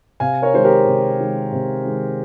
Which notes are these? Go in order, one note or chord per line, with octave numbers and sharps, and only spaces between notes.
C3 F5 G#5
A#4 C#5
D#3 G#3 C5
G4 A#4
C3
D#3 G#3
C3
D#3 G#3